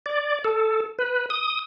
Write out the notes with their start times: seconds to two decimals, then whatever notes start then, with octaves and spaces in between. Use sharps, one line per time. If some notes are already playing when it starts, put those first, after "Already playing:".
0.06 D5
0.44 A4
0.99 B4
1.30 D#6